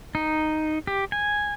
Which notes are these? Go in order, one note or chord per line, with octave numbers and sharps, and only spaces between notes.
D#4
G4
G#5